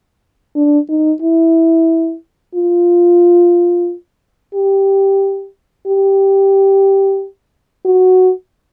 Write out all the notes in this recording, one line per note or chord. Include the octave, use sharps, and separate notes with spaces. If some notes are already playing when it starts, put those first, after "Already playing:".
D4
D#4
E4
F4
G4
G4
F#4